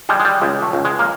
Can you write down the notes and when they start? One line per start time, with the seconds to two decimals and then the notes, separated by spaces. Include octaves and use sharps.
0.09 G3 G#3
0.20 G#3
0.25 G3
0.42 C#2 G#3
0.62 A3
0.73 C#2
0.85 G#3
0.99 A#3